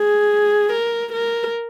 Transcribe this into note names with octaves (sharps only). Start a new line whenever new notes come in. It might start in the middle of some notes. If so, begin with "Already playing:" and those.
Already playing: G#4
A#4
A#4